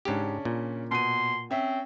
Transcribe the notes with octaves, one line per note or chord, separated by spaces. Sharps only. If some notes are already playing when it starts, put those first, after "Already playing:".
G#2 C#3 C#4 D4 G4
A#2
B2 C6 D#7
C4 C#4 E5